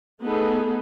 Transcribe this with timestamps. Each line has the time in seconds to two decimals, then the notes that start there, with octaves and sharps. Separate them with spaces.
0.21 A3 B3 D#4 G#4 A4